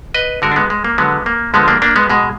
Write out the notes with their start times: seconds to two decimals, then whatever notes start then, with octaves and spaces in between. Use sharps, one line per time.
0.14 B4 D#5
0.42 D3 G#3 F#4 A#4
0.51 D4
0.56 G#3 B3
0.70 G#3
0.85 A#3
0.98 D3 F#3 G#3 B3
1.26 A#3
1.54 D3 F3 G#3 B3
1.68 A#3 D4
1.82 A#3 D4
1.96 G#3 B3
2.10 B2 G#3